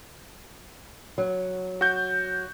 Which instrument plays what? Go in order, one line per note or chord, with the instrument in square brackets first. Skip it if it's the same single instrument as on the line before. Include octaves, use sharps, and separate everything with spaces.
[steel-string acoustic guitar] F#3
[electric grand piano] F#4 G6